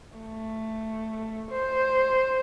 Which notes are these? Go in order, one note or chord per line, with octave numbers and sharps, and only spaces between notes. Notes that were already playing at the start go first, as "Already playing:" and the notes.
A3
C5